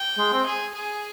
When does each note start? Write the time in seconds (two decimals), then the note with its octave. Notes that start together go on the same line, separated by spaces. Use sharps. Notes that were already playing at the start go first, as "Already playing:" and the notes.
Already playing: G5
0.18 G#3
0.33 C4
0.46 G#4
0.74 G#4